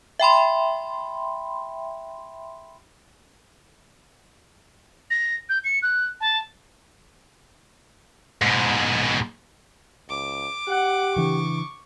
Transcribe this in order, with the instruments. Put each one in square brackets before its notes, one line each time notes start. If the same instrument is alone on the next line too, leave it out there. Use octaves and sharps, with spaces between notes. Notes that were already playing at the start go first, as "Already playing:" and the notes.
[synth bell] E5 G5 B5 C6
[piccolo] A#6
G6
C#7
F#6
A5
[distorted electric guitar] G#2 B2
[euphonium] C#2 [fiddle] D6
[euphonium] G4 [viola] F#5
[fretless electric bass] C#3 E3 D4 [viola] C#6